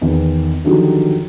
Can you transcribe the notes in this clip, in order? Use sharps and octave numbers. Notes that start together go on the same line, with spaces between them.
E2 D#3
D3 D#3 F3 F#3 D#4 G4